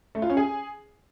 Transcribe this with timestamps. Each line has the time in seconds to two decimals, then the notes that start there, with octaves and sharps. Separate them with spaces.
0.15 A3
0.22 F4
0.30 C#4
0.37 G#4